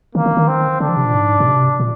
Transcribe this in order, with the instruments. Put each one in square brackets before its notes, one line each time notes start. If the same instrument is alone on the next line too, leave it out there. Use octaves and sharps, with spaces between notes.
[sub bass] D#3 [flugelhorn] A#3
[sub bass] D#3
D#3
[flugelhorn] C4
[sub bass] D3 [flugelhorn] D4
[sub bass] F3
C3
A#2
G#2
A#2
C3
A#2